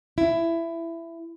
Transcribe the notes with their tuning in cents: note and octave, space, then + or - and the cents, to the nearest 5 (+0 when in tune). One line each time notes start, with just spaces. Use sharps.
E4 +15